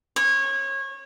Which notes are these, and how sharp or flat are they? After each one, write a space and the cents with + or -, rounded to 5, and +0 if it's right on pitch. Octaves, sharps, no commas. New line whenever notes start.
C#5 -25